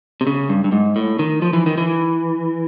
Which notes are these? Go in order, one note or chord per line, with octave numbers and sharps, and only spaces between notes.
C3
C#3
G2
G2
G#2
A2
D#3
F3
E3
D#3
E3